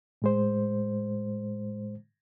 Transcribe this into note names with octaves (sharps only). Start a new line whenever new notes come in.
A2 G#3 C5